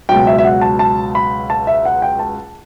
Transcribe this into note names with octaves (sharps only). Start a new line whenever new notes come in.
C#2 B2 F#3 G5
E5
E5
F#5
A5
A5
B5
A5
E5
F#5
G5
A5